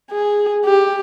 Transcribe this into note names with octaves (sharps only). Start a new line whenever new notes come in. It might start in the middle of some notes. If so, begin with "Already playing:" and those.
G#4
G4